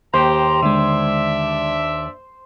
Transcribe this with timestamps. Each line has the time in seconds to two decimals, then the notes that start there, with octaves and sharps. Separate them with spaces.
0.14 D#2 G4 C5 A#5
0.63 D3 G#3 D4 D5 E5